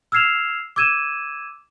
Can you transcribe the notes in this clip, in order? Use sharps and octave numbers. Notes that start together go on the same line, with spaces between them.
E6 F6 G#6 C7 E7 F7
D6 E6 G#6 D#7 E7